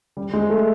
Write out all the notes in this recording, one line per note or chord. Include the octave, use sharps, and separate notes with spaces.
G3
G#3
A3